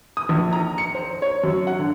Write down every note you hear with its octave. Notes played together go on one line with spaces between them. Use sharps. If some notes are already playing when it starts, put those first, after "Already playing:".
D#6
A#1
A#5
C#7
C5
C#5
F#2
F#5
D3